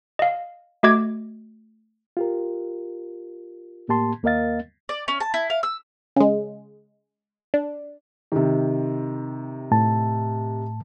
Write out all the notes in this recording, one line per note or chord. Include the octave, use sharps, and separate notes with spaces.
D#5 F5
A3 F#4 D#5 D6 G#6
F4 G4 A#4
A2 A#3 G4 A5 C6
D#2 A#3 A#4 D#5 F5 A6
D5
C#4
A5
E4
F5
E6
C#3 G#3
D4
C3 D#3
A2 A5